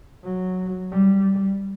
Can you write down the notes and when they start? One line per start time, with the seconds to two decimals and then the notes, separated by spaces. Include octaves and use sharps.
0.23 F#3
0.92 G3